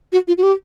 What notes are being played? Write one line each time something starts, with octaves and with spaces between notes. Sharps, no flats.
F#4
F4
F#4
G4